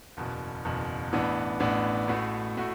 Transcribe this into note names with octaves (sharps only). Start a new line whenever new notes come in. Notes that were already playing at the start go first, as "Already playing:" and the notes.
F#1 E2 B2
F#1 E2 B2
A1 A2 E3 B3 D4
A1 A2 E3 B3 D4
A1 A2 A3 F#4
A2 A3 F#4